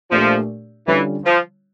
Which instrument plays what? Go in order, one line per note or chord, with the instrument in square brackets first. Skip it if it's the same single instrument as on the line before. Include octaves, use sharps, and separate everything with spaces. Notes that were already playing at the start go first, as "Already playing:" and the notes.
[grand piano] A#2 A3 D4 G4 [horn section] F3
[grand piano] D3 G3 C#4 F4 C#5 [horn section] E3
[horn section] F3